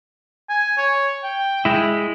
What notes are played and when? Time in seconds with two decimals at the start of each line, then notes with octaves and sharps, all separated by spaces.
0.49 G#5
0.78 C#5
1.23 G5
1.65 G#3 E4